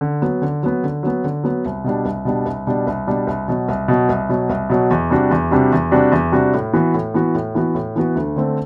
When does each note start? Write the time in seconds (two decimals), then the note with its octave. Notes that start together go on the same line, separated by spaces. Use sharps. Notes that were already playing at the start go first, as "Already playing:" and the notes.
0.01 D3
0.22 F#3 B3
0.42 D3
0.63 F#3 B3
0.84 D3
1.03 F#3 B3
1.24 D3
1.44 F#3 B3
1.65 C2
1.84 B2 G3 D4
2.05 C2
2.25 B2 G3 D4
2.45 C2
2.67 B2 G3 D4
2.87 C2
3.07 B2 G3 D4
3.27 C2
3.48 B2 F#3
3.68 C2
3.88 B2 F#3
4.09 C2
4.29 B2 F#3
4.49 C2
4.69 B2 F#3
4.91 E2
5.10 C3 G3 D4 F#4
5.31 E2
5.51 C3 G3 D4 F#4
5.72 E2
5.91 C3 G3 D4 F#4
6.12 E2
6.32 C3 G3 D4 F#4
6.53 A2
6.73 E3 B3 F#4
6.94 A2
7.14 E3 B3 F#4
7.35 A2
7.55 E3 B3 F#4
7.75 A2
7.96 E3 B3 F#4
8.15 D2
8.36 D3 A3 C4